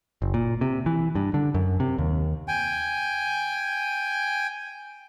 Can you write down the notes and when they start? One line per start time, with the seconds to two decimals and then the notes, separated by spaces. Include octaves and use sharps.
0.22 F#1
0.34 A#2
0.61 C3
0.86 E3
1.15 G2
1.34 D3
1.54 F#2
1.80 C3
1.98 D#2
2.48 G5 G#5